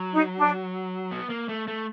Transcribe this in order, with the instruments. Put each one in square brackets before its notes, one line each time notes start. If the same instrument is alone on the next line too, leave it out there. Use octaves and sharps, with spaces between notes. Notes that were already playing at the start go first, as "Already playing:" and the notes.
Already playing: [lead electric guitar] F#3
[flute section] D#4
D4
[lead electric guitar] B3
A#3
A3
A3